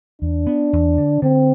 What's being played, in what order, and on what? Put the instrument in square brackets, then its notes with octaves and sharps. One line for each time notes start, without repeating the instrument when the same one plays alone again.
[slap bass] E2 [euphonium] D4
[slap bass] B3
E2
D3
[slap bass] D3 [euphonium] C4